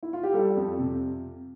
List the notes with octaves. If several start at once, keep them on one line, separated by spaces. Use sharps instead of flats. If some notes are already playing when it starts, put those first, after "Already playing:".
E4
F4
G4
G3 A4
F2
C3